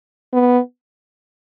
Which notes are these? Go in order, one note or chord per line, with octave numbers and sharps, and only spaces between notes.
B3